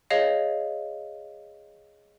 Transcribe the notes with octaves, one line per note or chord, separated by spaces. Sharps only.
G#4 C#5 D#5 F5